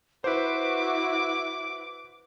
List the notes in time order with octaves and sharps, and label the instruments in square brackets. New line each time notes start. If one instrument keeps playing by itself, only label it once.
[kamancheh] E4 F#4 [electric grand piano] B4 C5 [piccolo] D6